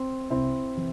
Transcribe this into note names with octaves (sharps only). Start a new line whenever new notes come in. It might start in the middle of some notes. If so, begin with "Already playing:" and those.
Already playing: C4
C2 C4 E4
C3 E3